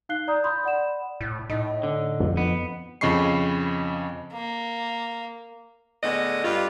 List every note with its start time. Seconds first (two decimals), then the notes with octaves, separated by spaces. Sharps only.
0.09 D#4 F5 F#6 C7 G7
0.28 D5 A#5 D#6 G6
0.44 B5 C6 D#6 G6
0.64 D5 F#5 B5 E7
1.21 A2
1.50 A2 D#4
1.83 D3
2.20 F2 F3
2.37 B3
3.01 F2 C#3 D#5 B5 C#6 C7
4.33 A#3
6.03 A2 D3 G#3 B3 D#5
6.44 G2 G3 F4